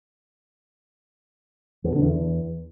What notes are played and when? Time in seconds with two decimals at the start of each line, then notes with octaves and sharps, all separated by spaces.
1.84 E2
1.90 B2
1.96 D3
2.02 E2